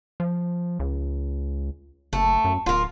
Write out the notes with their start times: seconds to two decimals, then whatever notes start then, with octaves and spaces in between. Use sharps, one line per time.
0.20 F3
0.80 C#2
2.13 F#1 A3
2.44 F#2
2.66 D1 F4 A#4